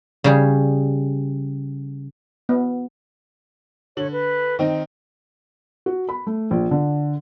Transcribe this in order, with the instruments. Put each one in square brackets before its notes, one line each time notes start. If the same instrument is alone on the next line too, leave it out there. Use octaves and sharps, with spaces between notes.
[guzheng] C#3 G3 G#4
[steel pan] B3
[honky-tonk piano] D3 F#7 [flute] C#5
[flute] B4
[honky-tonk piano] D#3 C4 D#4
[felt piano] F#4
B5
A3
A#1
D3